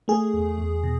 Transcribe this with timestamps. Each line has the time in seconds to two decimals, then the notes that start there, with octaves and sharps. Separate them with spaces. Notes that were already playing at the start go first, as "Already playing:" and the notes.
0.08 A3 G#4
0.34 E2
0.58 E2
0.83 B2